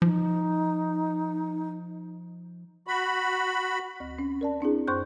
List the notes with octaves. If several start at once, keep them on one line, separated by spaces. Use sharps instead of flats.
F3 D#4
F#4 B5
D2
C#4
A#4 D5 A5
C4 D4 E4 G#4
F#2 C5 C6 C#6 F#6 G6